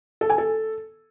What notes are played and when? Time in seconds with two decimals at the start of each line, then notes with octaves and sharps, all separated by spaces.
0.21 A4
0.30 G#5
0.38 A4